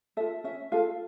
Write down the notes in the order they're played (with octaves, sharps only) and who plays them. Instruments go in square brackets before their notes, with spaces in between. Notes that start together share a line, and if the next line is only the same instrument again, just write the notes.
[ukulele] A4 E5
F4
C#4 E5
F4 A4 F5